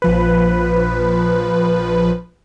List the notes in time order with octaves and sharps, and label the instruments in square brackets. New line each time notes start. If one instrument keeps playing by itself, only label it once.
[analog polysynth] A#1 F3 B4